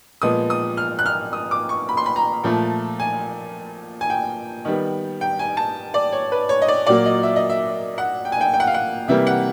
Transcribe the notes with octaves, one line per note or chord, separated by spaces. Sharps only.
A#2 F3 G#3 B3 D#6
D#6
F6
F#6
F6
D#6
D6
C#6
B5
C6
B5
A#5
A#2 F3 A3
G#5
G#5
G5
D#3 G3 B3
G5
G#5
A5
D5
C#5
B4
C#5
D#5
D5
A#2 F#3 A#3 D5
D#5
E5
D#5
E5
F#5
G5
G#5
G5
G5
F#5
F5
F#5
C3 E3 G3 A#3 E5
F#5